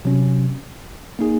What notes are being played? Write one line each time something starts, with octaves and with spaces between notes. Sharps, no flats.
C3 F#3 C#4
A#3 D#4 G#4